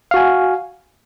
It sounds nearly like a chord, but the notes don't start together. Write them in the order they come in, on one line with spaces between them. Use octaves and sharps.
F5 F#4 G#5